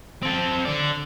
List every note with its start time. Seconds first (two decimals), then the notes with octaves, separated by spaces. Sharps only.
0.23 C4 A4
0.65 D3 D5